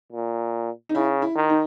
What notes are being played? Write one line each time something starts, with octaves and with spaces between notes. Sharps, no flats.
A#2
D#4
C#3 E4
E4
D#3
D#4